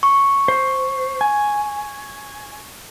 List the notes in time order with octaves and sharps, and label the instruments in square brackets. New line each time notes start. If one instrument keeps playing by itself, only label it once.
[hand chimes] C#6
[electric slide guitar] C5
G#5